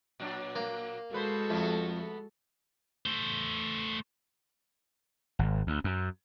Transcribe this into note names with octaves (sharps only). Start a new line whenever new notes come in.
A#2 F#3 D4
A#3
B2 G#3 F#4 A4 B4 C5
F2 A3 B3
A3 C5
G#1
D2
F#2